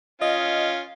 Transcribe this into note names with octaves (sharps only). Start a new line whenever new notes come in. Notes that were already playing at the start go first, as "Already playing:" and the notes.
C#4 F4 D#5